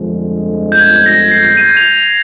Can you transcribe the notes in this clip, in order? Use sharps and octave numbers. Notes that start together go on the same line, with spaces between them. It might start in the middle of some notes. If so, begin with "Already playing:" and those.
Already playing: G1 F2 D3 F3 G#3
G6
G#6
A#6
C7
D#7
F7
F7